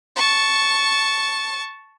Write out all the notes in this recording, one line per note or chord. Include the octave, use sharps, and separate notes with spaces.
A5 C#6